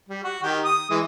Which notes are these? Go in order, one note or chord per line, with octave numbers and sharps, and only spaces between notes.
G3
F#4
D#3 G4
D#6
E3 G#3